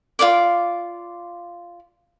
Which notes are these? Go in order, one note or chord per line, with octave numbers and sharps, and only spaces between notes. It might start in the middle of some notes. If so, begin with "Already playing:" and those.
F4 C5 D5 D6